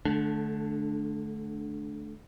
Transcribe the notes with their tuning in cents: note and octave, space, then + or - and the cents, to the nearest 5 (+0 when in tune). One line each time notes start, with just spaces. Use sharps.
D3 +5 A3 -25 D4 +0